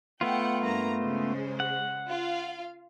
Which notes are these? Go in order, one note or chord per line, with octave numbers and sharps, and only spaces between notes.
A3 B3 F4 F#5 G5
G2 A#3 A#5
C#3 G#3 C5
F#5
F4 F5